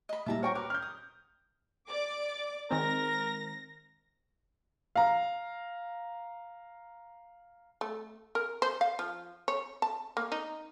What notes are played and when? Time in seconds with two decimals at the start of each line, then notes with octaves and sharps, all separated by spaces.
0.09 D#5 B5
0.26 A#2 G3 E5 A5 A#5
0.43 F#4 A#4 C5 C#5 G5 C#6
0.55 A#4 B4 D6
0.70 F6 G6
0.82 D#6
1.87 D5 D6
2.71 D#3 G#3 C4 A#4 A#6
4.96 F5 A#5
7.81 A3
8.35 A#4
8.62 C5
8.81 F5
8.99 F3
9.48 C#5
9.82 A5
10.17 A#3
10.32 D#4